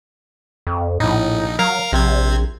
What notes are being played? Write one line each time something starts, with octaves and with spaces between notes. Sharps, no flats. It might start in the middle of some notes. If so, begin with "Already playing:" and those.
F2
A#1 A2 D#4
F#3 A#4 F5 A#5
A#1 C3 C4 G#6